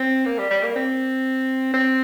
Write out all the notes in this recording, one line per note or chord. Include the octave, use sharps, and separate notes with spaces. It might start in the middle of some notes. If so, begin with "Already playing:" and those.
Already playing: C4
A#3
G3
G3
A#3
C4
C4